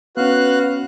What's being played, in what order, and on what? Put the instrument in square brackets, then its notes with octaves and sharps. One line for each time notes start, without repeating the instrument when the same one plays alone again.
[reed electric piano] B3 C#4 [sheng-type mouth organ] F#4 F5 F#6 [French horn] B4